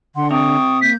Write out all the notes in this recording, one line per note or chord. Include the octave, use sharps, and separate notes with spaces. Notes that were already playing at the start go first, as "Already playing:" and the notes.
D3 F#5 C6
C3 G5 C#6 D#6
A#3 G6 B6